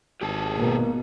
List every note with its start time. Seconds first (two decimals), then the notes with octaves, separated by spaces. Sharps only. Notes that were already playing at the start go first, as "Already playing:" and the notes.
0.21 G#1 G4 G#4 A5
0.57 B2 A#3